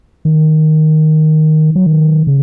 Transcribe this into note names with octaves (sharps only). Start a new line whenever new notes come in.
D#3
F#3
D#3
C#3